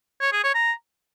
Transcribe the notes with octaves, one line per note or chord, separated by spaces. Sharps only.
C#5
G#4
C#5
A#5